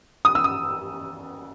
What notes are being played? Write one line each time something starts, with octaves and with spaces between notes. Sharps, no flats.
D#6
E6
D#6